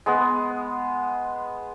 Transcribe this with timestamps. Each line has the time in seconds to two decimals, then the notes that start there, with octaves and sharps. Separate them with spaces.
0.06 G#3 B3